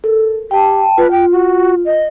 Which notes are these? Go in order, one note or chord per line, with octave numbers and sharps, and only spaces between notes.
A4 A#4
G4 G5 A5
F4 B4
G5
F#4
D#5